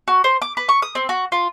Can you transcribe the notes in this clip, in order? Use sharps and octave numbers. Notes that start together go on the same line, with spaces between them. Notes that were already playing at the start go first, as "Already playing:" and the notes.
F#4
C5
D6
B4
C#6
D#6
C4
F#4
F4